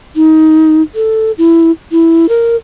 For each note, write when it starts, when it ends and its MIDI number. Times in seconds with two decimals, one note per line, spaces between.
0.16 0.82 63
0.95 1.32 69
1.38 1.71 64
1.92 2.29 64
2.29 2.56 70